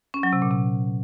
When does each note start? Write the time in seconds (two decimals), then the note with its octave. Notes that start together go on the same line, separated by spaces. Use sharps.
0.14 C#4
0.23 F#3
0.33 C3
0.42 A#2
0.51 C3